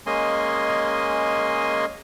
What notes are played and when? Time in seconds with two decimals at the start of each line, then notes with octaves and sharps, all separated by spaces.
0.06 G#3 A#3 C#4 D#5 G#5 C6